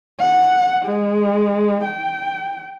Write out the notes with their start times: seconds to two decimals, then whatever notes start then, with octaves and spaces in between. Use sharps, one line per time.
0.20 F#5
0.86 G#3
1.85 G5